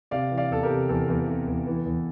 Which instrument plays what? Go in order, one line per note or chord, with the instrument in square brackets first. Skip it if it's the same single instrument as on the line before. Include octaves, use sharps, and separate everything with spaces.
[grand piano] C3 D5 F5
E3
D5 F5
E2 A4
G4 A#4
C3
E2 A4
E2
C3
E2
E3
E2